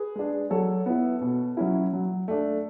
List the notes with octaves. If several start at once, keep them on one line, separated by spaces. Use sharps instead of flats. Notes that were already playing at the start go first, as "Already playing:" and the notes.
Already playing: G#4 B4
G#3 D4
F#3 A4 C#5
B3 E4
B2
F#3 C#4 E4
F#3
A3 D4